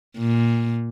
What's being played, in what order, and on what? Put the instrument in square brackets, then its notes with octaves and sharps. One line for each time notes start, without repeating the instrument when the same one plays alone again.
[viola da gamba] A#2